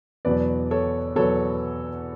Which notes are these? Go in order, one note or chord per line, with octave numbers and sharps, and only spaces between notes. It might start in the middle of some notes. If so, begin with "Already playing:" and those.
E2 B2 F#3 B3 B4 D5
A4 C#5
E2 B2 F#3 B3 A4 C#5